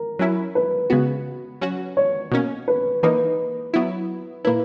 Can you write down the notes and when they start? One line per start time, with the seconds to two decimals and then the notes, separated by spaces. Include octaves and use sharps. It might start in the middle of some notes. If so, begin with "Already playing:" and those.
Already playing: A#4
0.19 F#3 C#4 E4
0.55 B4
0.90 C#3 G#3 B3 F#4
1.61 F#3 C#4 F#4
1.97 C#5
2.31 B2 A#3 C#4
2.68 B4
3.03 E3 A#3 D#4 B4
3.74 F#3 B3 E4
4.45 A#2 A#3 E4 B4